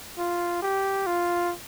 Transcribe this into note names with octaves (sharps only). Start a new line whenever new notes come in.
F4
G4
F4